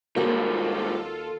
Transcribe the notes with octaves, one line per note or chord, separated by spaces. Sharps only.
D#2 G#2 G3 A#3 F4 F#4 A4 F#5